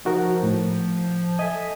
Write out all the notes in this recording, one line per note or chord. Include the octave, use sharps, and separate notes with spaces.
F3 D#4 F#4 A#4
A2
A4 D#5 E5 G#5